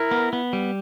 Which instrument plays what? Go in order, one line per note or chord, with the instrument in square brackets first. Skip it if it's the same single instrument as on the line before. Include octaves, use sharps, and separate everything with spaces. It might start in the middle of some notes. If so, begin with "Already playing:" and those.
Already playing: [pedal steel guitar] E4 [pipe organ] A#4
[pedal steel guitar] B3
B3
G3